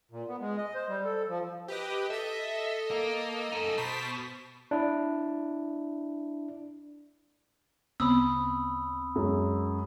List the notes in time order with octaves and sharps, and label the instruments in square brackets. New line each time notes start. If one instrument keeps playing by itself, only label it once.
[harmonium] A#2
B3
G#3
D#5
C5
G3
A4
F3
[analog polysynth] G4 B4 D#5
[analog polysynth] A4 D#5 [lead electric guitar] E5
[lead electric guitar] A#3
F#2 D#4
[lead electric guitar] B2 [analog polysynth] C5 A5 B6
[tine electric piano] D4 E4
[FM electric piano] D2 C#3 C4 [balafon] B3 [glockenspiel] B5 D#6 E6
[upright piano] F#2 G#3